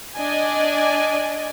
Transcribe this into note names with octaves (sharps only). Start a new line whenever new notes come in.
D4 D5 D#5 G#5